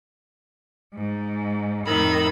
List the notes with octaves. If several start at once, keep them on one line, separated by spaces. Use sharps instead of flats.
G#2
F2 A2 D#3 B5 E6